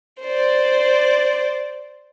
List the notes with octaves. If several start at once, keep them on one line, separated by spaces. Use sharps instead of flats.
C5 D5